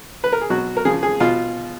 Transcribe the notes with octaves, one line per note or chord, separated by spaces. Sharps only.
B4
A#4
G#4
B2 F#3 F#4
A#4
C#3 F3 G#4
G#4
B2 F4